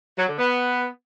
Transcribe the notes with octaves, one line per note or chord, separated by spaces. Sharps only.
F#3
D3
B3